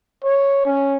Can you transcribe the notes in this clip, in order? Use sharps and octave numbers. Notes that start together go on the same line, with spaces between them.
C#5
C#4